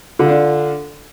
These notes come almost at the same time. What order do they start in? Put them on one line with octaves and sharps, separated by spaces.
D3 F4 D4